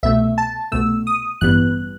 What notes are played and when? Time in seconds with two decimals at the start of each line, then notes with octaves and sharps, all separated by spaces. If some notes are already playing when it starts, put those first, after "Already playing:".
0.03 C2 B2 A3 E5
0.38 A5
0.72 C2 B2 A3 E6
1.07 D#6
1.41 A1 G2 E3 G3 B3 F#6